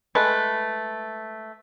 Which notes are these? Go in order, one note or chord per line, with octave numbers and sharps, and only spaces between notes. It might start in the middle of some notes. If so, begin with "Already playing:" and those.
G#3 A3 B4